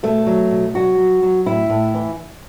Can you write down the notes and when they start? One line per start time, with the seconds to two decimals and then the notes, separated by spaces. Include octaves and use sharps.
0.03 B2 A3
0.27 F#3
0.51 B2
0.74 F#3 F#4
0.98 F#3
1.23 F#3
1.46 A2 E4
1.70 A2
1.94 E3